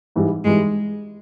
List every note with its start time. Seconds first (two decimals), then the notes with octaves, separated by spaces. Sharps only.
0.16 G#2 E3 G3
0.44 G#2 E3 G3 G#3